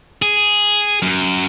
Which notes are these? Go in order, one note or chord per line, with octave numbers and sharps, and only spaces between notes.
G#4
F#2